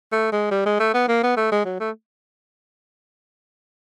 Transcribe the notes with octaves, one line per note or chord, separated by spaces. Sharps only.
A3
G#3
G3
G#3
A3
B3
A#3
B3
A3
G#3
F#3
A3